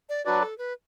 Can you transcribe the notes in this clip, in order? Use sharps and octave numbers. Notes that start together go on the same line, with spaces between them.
D5
F#3 D4 F#4 B4 D5
A4
B4